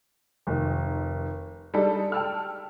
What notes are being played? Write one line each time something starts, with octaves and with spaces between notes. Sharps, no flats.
F1 D#3
G3 G#3 D4 D#4 A4
G5 A5 E6 F6